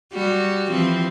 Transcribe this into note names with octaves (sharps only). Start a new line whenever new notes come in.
G3 F#4
E3 F3 C4